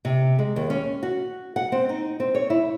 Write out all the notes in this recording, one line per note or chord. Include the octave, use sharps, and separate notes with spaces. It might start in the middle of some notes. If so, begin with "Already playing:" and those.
C3
G#3
D#2
C#4
F#4
F#5
C4
D#4
C4
C#5
E4